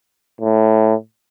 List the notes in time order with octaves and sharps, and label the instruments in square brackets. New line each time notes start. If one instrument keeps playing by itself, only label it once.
[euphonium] A2